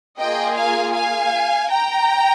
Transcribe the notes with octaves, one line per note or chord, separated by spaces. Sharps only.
A#3 F4 G#4 D#5 G5
F5 G#5
F5 G#5
G5 A#5